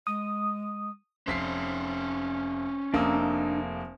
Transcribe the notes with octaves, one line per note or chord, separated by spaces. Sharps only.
G#3 D#6
F1 C#4 C5 B6 C7
F1 A#3 D4 D#4 D#6 E6